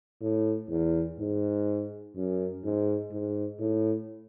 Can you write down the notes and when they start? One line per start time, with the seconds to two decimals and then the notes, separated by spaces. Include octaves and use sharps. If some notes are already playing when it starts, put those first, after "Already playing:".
0.22 A2
0.70 E2
1.19 G#2
2.16 F#2
2.64 G#2
3.12 G#2
3.60 A2